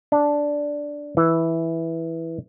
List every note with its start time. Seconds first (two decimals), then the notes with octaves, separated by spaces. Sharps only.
0.12 D4
1.17 E3